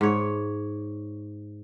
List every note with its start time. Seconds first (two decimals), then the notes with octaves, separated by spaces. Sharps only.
0.01 G#2 C#5